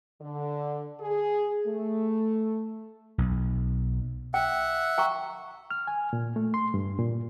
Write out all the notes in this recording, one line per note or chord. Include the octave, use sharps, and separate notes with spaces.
D3
G#4
A3
B1
E5 F#5 G5
G5 A#5 C#6
F6
G#5
A#2
A3
C6
G2
A#2